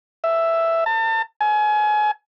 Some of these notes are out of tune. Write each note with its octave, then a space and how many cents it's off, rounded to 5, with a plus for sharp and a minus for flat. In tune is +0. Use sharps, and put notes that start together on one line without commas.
E5 +5
A5 +35
G#5 +30